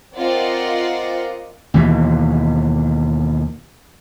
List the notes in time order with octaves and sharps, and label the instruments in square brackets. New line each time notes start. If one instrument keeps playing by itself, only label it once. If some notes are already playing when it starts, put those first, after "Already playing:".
[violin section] C4 F4 A#4 D5 D#5 F#5
[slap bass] D#2 B2 E3